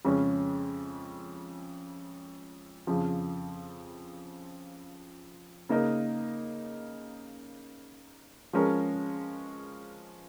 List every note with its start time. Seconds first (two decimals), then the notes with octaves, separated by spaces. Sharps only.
0.05 F2 C#3 G#3 C#4
2.87 F2 C#3 F3
5.69 C#3 A#3 D#4 A#4 D#5
8.53 F3 G#3 C#4 A#4